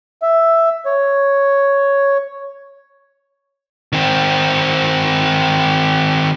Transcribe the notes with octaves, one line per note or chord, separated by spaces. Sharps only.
E5
C#5
D#3 C4